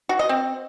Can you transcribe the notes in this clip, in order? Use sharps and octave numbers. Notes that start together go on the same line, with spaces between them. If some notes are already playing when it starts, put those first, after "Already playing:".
F#4
D#5
C4